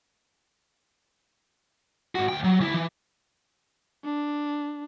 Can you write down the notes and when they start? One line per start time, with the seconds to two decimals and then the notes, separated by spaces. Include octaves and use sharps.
2.15 G#2 F#4
2.29 D2 G5
2.44 F#3
2.60 D2 E4
2.74 E3
4.05 D4